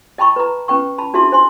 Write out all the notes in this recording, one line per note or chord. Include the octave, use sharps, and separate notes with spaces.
D#5 G5 A5 B5 C#6
B4 A#5
C#4 B4 G5 C#6
A5 B5
D4 F#4 G#4 E5 A5 C6
C5 G#5 C6